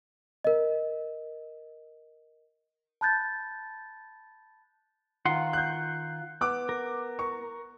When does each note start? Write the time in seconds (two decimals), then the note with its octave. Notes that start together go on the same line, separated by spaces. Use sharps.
0.44 A#4 D#5
3.01 A5 B5 F#6 G6 A6
5.25 D#3 F4 F#5 C6
5.53 F#6 G6
6.41 B3 D6 F#6
6.69 A#4
7.19 C#6